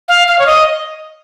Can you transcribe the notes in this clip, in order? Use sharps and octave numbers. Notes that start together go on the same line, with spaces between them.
F5
F5
C#5
D#5